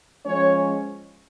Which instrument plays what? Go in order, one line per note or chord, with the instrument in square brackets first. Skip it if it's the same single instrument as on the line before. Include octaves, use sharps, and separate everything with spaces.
[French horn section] F3 G#3 C#4 C#5